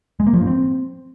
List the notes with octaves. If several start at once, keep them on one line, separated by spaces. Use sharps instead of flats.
G#3
A#3
F3
G2
C4